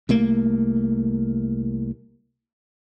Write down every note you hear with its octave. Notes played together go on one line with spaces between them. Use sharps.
C2 A3 A#3